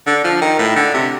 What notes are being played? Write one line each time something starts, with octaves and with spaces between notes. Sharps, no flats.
D3
F3
D#3
A2
D3
C3